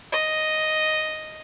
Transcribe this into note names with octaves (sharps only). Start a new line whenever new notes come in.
D#5